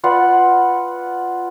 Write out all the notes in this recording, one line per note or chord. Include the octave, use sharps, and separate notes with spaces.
F4 B4 D5 F#5